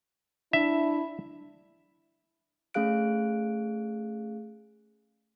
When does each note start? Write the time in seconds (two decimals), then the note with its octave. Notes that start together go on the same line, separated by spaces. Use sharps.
0.53 D4 E4 E5
2.74 A3 C#4 G#4 F5 F#6 D7